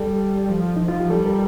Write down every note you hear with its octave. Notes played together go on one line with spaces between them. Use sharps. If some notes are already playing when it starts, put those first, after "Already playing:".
Already playing: G3 A4
F3
F3 D#4
F4
G4
G3 A4
A#4